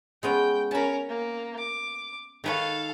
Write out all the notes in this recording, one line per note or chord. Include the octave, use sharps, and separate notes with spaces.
G#3 B3 C#4 G5
C#4 A#4 A5 B5
A#3
D6
D#3 A4 B4 C#5 F5